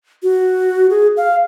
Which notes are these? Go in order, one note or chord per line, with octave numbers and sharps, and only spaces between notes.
F#4
G#4
F5